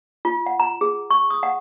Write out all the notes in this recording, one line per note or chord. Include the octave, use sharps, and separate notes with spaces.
F4
F#5
A#5
G#4
C#6
D#6
F#5